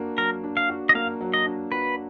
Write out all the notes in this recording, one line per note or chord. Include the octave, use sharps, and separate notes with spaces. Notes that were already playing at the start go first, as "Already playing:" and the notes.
Already playing: A#3 D4 F#4
F#3 A#4
D4
F5
F#4
D#5
A#3 F5
F#3
D#5
D4
F#4 B4